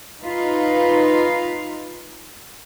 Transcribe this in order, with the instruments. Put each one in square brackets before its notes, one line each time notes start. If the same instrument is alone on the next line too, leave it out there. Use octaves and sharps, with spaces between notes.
[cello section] D#4 F4 B4 F5